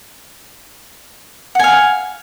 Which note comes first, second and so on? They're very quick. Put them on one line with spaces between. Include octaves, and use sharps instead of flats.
F#5 G#5 F5